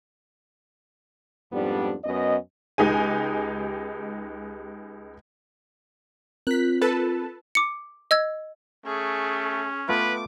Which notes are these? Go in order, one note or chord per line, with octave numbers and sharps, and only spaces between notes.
F2 G#2 G3 B3 D4
F#2 B3 D#5
C#2 G#3 D#4 G4 G#5
C4 F4 A#4 F#6 B6
A4 B4 A5
D6 C#7
D#5 E6 G#6
A3 C#4 G#4
A3 B3 F4 B4 D6